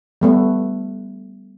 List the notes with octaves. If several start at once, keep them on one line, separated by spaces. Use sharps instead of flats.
G3 A3 B3